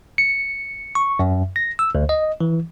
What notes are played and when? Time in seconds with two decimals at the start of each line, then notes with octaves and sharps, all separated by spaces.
0.18 C#7
0.95 C#6
1.19 F#2
1.56 A#6
1.79 E6
1.95 D2
2.09 D#5
2.41 E3